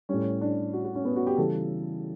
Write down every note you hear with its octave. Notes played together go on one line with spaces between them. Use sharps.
A2 G3 C#4
D4
F#4
F#4
C#4
B3
F#4
G4
C#3 E3 G3 A4